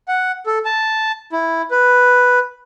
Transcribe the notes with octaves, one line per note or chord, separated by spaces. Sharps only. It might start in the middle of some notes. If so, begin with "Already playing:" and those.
F#5
A4
A5
E4
B4